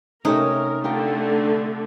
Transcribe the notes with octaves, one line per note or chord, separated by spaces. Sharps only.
C3 A3 C#4 D#4 A#4 C5
D3 A3 F4 G4 A#4